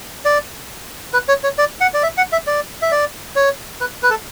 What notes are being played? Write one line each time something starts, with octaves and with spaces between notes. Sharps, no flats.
D5
B4
C#5
C#5
D5
F#5
D5
E5
F#5
E5
D5
E5
D5
C#5
B4
B4
A4